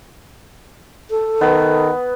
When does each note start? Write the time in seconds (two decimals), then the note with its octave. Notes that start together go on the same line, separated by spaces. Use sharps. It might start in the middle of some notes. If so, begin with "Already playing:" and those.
1.10 A4
1.41 D#3 B3